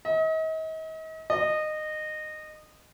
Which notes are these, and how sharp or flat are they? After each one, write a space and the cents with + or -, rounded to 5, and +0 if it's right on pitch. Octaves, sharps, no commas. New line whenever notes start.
D#5 +40
D#5 -20